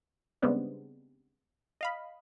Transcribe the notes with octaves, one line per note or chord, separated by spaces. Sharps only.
C#3 G3 G#3 B3 C4 D4
D#5 F5 B5